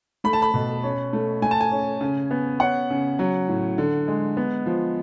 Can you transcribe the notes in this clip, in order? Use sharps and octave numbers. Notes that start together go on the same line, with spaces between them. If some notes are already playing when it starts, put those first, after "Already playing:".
A3 B5
A5
B5
B2
C#4
A3
A3 G#5
A5
G#5
C#4
C#3
B3
C#4 F#5
C#3
F#3
A2
D3
G#3
B3
F3